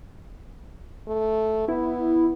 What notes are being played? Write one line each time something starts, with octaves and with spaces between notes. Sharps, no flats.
A3
B3 E4